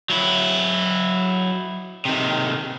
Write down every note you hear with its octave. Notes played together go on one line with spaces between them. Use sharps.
F#3 E4
C3 D#3